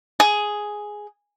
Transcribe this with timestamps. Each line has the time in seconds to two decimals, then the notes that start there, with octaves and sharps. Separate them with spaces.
0.20 G#4